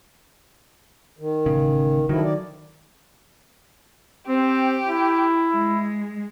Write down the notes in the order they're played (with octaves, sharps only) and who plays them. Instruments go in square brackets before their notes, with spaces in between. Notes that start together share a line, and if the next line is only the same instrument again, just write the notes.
[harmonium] D#3
[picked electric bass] A1 C#3
[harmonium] D3 F3 E4 [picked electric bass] D#3 F#3
[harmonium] D5
[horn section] C4 [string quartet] G4
[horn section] E4
[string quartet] G#3